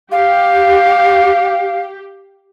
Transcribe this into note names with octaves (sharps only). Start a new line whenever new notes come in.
G4 F5